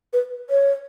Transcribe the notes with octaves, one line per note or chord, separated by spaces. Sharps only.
B4
C#5